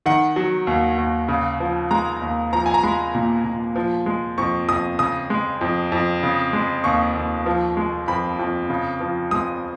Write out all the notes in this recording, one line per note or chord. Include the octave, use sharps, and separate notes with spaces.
D#3 F#5
F#3
D#2
D#2
C#3
F3
G#3 A#5
D#2
F3 A#5
G#5
A#5
G#3 B5
A#2
A#2
F3
G#3
F2 C#6
F2 D#6
C#3 D#6
G#3
F2
F2
C#3
G#3
D#2 C#6
D#2
F3
G#3
F2 B5
F2
C#3
F3
G#3 D#6